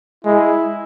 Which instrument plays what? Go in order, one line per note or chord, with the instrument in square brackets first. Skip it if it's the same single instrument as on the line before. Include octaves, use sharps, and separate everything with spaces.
[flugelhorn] G#3 [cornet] E4